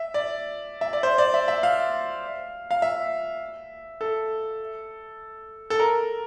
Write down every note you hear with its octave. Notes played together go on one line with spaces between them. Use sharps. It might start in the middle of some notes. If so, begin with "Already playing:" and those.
Already playing: E5
D5
E5
D5
C5
D5
E5
E5
F5
F5
E5
A4
A4
A#4